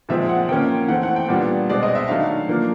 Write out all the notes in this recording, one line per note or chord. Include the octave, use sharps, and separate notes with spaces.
A#2 F3 G#3 C4 E5
F#5
F3 A#3 C#4 G5
E3 A3 C4 F#5
F#5
G5
A#2 G3 B3 D4 F#5
B2 G#3 C4 D5
D#5
E5
D#3 F#3 A3 D4 F5
F3 A#3 D4